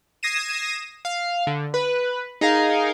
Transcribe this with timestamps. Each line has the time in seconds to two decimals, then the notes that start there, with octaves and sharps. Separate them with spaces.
0.23 D#6 G#6 A#6 C7 D#7 E7
1.05 F5
1.47 D3
1.74 B4
2.41 D#4 G#4 A#4 F5